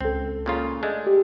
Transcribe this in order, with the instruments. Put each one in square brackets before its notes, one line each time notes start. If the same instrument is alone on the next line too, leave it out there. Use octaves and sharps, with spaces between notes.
[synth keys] C#2 A4 [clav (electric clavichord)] C4
[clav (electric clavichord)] A#2 C#3 F4
G#3 A3 D4
[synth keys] G4